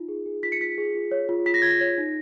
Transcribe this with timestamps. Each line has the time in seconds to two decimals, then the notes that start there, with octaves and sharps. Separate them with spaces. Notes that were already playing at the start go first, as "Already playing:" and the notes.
Already playing: D#4 F4
0.08 G#4
0.26 G#4
0.43 F4 B6
0.52 C#7
0.60 F4 B6
0.78 G#4
0.95 F4
1.11 C#5
1.29 F4
1.46 F4 B6
1.54 A#6
1.62 F4 G#6
1.70 A#6
1.81 C#5
1.98 D#4